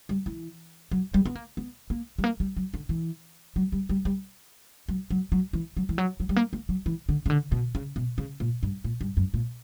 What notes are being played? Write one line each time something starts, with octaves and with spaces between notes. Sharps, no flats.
G3
E3
F#3
G3
B3
A#3
B3
A#3
G3
A#3
G3
F#3
D3
E3
F#3
G3
G3
G3
F#3
F#3
F#3
E3
F#3
E3
F#3
F#3
G3
A#3
A#3
F#3
E3
D3
C#3
D3
B2
C#3
B2
C#3
A#2
G2
A#2
G2
F#2
A#2